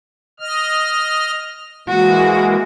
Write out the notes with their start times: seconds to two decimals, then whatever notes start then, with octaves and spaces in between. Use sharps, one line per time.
0.40 D#5 F6
1.88 E3 G#3 A#3 F#4